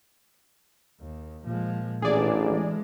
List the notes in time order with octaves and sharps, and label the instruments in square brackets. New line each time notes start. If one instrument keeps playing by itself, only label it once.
[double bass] D#2
[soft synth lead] A#2 [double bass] F3 G#3
[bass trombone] A1 [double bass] E3 D4 [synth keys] G#4 D5
[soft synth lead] E3 [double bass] G#3